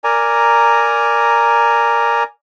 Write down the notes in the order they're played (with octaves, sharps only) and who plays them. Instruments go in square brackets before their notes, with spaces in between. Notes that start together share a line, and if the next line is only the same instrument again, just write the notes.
[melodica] A#4 D5 G#5 A#5